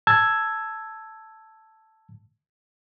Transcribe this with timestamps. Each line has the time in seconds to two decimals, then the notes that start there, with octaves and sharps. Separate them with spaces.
0.07 A5 E6 G#6